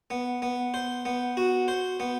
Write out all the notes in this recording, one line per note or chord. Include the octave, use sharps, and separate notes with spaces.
B3
B3
C5
B3
F#4
C5
B3